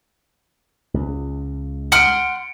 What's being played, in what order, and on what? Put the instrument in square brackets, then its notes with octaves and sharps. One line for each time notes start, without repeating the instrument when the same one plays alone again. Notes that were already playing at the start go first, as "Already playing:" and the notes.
[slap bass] C#2
[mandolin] F#5 C6 F6 [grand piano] C#7 D7